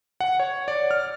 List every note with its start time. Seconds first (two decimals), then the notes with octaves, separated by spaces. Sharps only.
0.20 F#5
0.40 C#5
0.68 D5
0.91 F6